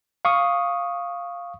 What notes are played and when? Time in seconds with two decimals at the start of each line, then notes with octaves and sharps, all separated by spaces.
0.25 F5 C#6 D#6